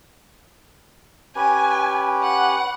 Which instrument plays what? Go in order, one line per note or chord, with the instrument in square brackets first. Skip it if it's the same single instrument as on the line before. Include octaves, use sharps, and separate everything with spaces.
[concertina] C#4 G4 B4 [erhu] G#5
[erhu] F#5